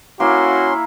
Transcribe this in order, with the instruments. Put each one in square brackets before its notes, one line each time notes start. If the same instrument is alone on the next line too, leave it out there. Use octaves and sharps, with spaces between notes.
[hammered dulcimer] A#3 [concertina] C#4 C6 [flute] E4 [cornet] F#4